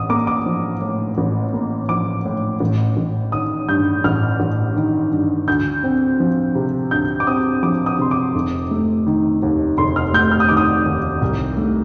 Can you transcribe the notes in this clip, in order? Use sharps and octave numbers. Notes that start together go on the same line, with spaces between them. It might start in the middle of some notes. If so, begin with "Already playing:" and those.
Already playing: A1 D#6
A#3 D6
D6
F3
A2
A1
A#3
F3 D6
A2
A1
A1
D#3 D#6
G2 G6
A1 F6
A1
D#3
G2
D2 G6
C4
F3
C3
D2 G6
D6
C4 D#6
F3 D6
D#6
C3 C6
D6
F1
A3
D#3
D#2
F1 C6
F6
A3 G6
F6
D#6
D#3 D6
D#6
D#2
C2
A3